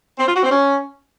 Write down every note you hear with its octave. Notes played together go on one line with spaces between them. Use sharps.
C4
F4
F#4
C4
C#4